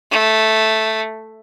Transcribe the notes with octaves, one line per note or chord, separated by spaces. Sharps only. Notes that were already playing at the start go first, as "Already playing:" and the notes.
A3